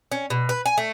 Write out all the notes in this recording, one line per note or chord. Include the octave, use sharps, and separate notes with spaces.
C#4
B2
B4
G#5
A3